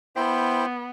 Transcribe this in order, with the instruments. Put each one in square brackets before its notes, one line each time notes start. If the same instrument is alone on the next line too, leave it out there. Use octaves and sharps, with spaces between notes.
[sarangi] B3 [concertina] E4 C5 G5